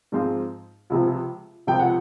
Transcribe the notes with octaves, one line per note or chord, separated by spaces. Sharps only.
G#2 F3 G#3 C4 F4
C#2 C3 F3
C#2 C3 F3 G5
F#5